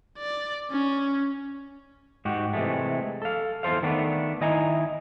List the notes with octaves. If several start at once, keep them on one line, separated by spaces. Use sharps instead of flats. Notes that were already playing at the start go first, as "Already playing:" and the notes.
D5
C#4
G#2 F#4 G4
C3 E3 F3 G#3 A3
A4 F5
E2 E3 A4 C5 F5
D#3 A3 B3 D4
D#3 E4 D#5 G#5 A#5